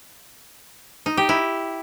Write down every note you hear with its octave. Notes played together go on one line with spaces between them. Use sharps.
D#4
G4
E4